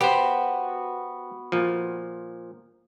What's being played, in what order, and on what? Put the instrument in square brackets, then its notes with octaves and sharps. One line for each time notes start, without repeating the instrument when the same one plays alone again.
[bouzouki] B3 F#4 [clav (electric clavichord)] G4 C5
[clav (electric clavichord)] A#2 F3